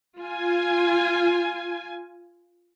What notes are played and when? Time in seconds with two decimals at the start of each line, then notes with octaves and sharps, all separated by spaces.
0.20 F4 G#5